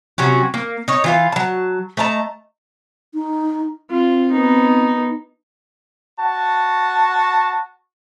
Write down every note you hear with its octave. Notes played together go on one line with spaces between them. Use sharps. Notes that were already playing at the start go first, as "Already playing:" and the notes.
C3 F#3 C#4 F#4
A#3
D#4 C#5
E3 F4 F5
F#3 A5
A3 D#5 A5 A#5
D#4
C4 F4
B3 D#4
F#4 A5